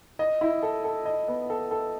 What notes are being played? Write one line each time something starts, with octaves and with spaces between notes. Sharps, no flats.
D#5
E4
A4
A4
D#5
B3
A4
A4